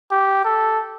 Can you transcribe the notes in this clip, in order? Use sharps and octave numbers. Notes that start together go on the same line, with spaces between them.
G4
A4